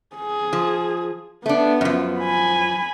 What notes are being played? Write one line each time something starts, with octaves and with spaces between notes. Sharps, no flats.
G#4
F3
A3 B3 D4
F#2 F3
G#5 B5